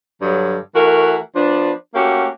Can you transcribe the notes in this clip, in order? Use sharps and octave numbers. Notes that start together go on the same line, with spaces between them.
G2 D3 F#3
E3 A3 F#4 A#4
F3 B3 D4
A3 A#3 C#4 F#4 G4